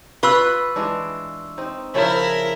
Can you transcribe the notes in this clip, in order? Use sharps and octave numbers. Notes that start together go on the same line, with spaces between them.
F4 B4 C#6 E6
E3 G#3 D4
C4 D#4
C#3 F3 C#4 E4 A#4